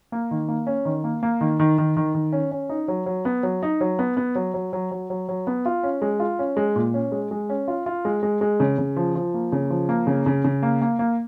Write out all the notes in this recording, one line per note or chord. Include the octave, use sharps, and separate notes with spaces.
A#3
D#3
A#3
C#4
D#3
A#3
A#3
D#3
D#3
D#3
D#3
D#3
C#4
C#4
D#4
F#3
F#3
B3
F#3
D#4
F#3
B3
B3
F#3
F#3
F#3
F#3
F#3
F#3
B3
F4
C#4
G#3
F4
C#4
G#3
A#2
C#4
G#3
G#3
C#4
F4
F4
G#3
G#3
G#3
C#3
C#3
F3
F3
A#3
C#3
F3
A#3
C#3
C#3
C#3
A#3
A#3
A#3